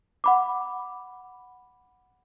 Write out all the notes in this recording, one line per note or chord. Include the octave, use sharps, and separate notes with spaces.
F#5 B5 D6